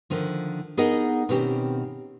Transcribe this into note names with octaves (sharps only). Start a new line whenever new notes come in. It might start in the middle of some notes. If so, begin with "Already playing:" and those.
D3 D#3 F3
B3 D#4 G#4 A#4 D#5 F#5
B2 D#3 C4 C#4 G4